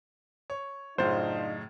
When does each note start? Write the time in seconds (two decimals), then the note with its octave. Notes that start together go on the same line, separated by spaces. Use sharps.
0.50 C#5
0.98 F#2 A2 C#3 D4 D#4 F4 C5